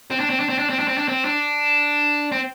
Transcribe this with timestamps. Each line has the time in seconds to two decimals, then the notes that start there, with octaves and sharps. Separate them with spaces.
0.11 C4
0.20 D4
0.30 C4
0.40 D4
0.49 C4
0.59 D4
0.70 C4
0.79 D4
0.88 C4
0.98 D4
1.08 C4
1.25 D4
2.32 C4